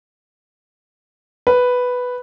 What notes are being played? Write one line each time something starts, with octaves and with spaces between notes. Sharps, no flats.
B4